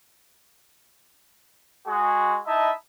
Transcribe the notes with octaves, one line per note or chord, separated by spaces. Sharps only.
G#3 F#4 G#4
D#4 E4 D#5 E5 A5 B5